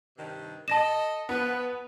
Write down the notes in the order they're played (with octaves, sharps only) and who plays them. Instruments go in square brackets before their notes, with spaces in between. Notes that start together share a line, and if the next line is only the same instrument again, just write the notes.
[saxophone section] G2 C3 D#3
[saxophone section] A4 D#5 [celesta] A5 A#6 E7
[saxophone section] F3 B4 [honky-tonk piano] B3